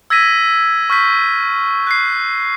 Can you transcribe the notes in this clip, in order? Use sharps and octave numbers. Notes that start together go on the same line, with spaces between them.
E6 G#6 A#6 B6 D#7
C#6 F6 G6 B6
F#6 B6 C7